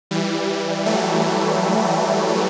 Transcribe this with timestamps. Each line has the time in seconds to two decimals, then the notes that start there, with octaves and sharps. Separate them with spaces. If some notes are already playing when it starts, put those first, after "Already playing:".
0.11 E3 G3
0.86 F#3 A3